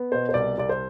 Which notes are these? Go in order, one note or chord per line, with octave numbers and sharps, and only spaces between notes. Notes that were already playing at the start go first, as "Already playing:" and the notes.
Already playing: B3
B2 C5
C5
C2 D5
C2 D5
C5